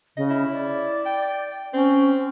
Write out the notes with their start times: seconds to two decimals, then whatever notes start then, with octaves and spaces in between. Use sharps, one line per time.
0.17 C#3 D#5
0.30 E4
0.53 D5
1.06 G5
1.74 C4 C#4